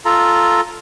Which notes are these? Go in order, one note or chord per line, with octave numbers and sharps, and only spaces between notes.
F4 A4 A#5